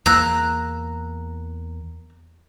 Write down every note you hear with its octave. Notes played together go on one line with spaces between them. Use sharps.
E2 A#3 A#5 E6 F#6